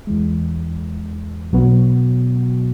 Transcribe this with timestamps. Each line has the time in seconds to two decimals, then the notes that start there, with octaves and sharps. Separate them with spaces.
0.07 E2 E3 G#3
1.53 B1 B2 F#3 B3 F#4